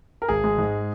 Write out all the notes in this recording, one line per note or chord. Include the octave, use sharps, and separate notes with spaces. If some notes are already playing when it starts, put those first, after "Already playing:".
A#4
G#1 G#4
G#3
G#2